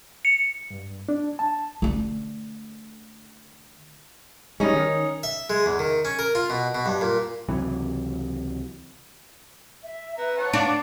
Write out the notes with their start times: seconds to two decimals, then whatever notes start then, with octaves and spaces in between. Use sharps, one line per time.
0.25 C#7
0.70 G2
1.09 D4
1.39 A5
1.82 D3 A3
4.60 G3 G#3 C#4 D#4
4.73 D#3
5.23 E5
5.50 G#3
5.66 E2
5.79 D#3
6.05 C#4
6.19 A#4
6.35 F4
6.50 B2
6.75 B2
6.86 G2
7.01 A#2
7.48 C#2 C3 E3 F#3
9.83 E5
10.18 B4 E5 A#5
10.38 C#5 F#5 A5
10.53 D4 F5